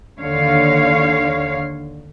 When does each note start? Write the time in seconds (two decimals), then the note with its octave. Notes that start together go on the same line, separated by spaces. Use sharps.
0.20 D#2 D3 C#5 F5